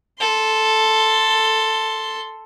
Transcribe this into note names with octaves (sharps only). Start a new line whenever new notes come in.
A4 C6